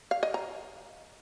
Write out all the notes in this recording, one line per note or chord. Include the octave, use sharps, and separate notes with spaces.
F5
D#5
A#5